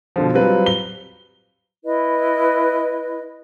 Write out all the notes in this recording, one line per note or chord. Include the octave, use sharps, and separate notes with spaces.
B2 D3 F3
F#3 G3 C4 F4 B4
G7
E4 B4 D#5